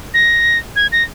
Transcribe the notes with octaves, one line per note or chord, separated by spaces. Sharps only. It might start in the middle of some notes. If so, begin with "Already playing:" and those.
A#6
G#6
A#6